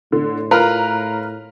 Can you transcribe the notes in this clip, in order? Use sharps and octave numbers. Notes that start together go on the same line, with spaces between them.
A2 D3
F4 A#4 B4 A#5 F6